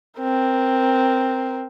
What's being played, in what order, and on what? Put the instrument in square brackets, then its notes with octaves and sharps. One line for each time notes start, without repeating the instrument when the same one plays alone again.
[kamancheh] C4 A#4